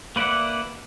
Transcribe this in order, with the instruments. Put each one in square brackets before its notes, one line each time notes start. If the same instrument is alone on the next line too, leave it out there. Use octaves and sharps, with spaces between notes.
[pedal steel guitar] A#3 B4 D5 E5 F#5